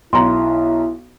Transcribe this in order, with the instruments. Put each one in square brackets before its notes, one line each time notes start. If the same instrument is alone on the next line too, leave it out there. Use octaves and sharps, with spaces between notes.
[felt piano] B1 A#5 [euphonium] E4 [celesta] C6